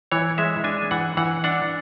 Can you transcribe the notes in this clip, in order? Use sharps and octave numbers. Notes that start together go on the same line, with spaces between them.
E3 C#5
G#3 E5
D4 G#5
E3 F#5
E3 F#5
D4 F#5